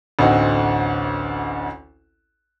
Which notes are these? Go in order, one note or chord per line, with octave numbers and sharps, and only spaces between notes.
A1 D2 C4 D#4 F#4 F#5